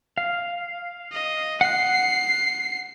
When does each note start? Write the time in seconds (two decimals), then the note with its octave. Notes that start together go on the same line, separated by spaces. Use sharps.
0.18 F5
1.12 D#5
1.61 F#5 F#6 C7